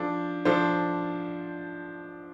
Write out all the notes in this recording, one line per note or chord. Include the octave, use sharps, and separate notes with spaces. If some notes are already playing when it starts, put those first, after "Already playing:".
Already playing: F3 D4 A4
F3 D4 A4 C5